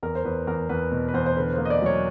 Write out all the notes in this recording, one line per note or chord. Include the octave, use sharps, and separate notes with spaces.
E2 A#4
C5
E2 B4
E2 A#4
E2 B4
B2
B4
E2 C5
C5
D3 B4
A#3 C5
D#5
D5
F#3 C#5